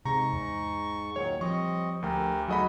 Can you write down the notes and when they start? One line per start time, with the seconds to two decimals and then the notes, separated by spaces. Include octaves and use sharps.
0.05 G#2 C3 A#5 C#6
0.33 E2
1.16 A#2 D#3 F#3 C#5
1.41 F3 G3 C4 D#5 C#6
2.02 D2 G4 A#4
2.48 F#3 D#4 F#4 G#4 A4 D#5 B5